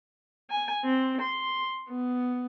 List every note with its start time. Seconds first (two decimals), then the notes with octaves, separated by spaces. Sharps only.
0.51 G#5
0.84 C4
1.21 C6
1.89 B3